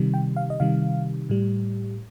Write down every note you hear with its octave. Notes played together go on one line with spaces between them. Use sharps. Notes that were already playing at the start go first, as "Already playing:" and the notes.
Already playing: C3 D#3 G3
G5
F5
D#5
C3 D#3 G3 F5
A2 G3